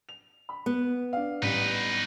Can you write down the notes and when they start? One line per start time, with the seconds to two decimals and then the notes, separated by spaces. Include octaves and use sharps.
0.09 F7
0.49 B5
0.66 B3
1.13 D4 F5
1.42 A1 G3 D#4 B4